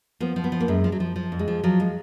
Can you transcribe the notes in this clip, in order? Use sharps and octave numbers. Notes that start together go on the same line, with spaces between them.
F3 B3
F3
B3
F3
A#3
F#2 G#3
F3
F#3
F3
F3
F2
G#3
F3
F3 F#3
G#3